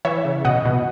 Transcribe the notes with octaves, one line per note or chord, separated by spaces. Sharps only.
E3 C#5 E5
C#3
B2 D#5 F#5
B2